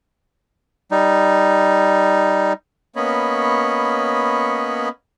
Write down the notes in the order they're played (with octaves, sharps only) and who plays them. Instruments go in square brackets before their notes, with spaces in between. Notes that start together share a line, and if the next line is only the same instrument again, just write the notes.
[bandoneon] G3 D#4
[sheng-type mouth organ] A#3 B3 C#4 C#5 D#5 B5